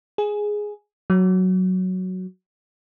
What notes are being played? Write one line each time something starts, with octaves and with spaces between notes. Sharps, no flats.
G#4
F#3